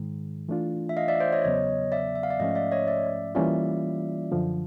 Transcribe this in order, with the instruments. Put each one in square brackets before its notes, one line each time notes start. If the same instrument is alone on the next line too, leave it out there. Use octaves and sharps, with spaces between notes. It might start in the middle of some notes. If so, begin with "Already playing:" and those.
Already playing: [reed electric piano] G#2 D#3 G#3
E3 A3 D4 F4
[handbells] E5
D#5 F5
D5 E5
C5 D5
C#5 D#5
[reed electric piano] E2 C#3 F#3 B3 [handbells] C#5 D#5
[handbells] D5 E5
E5
F5
D5 E5
[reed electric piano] G#2 F3 A3 C#4 [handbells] D#5 F5
[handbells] D5 E5
C#5 D#5
D5 E5
[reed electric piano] E3 G3 A#3 C#4 F4 [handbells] D5 E5
[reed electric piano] F#2 D3 F3